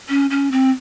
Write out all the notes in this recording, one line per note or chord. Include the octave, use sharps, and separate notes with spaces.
C#4
C#4
C4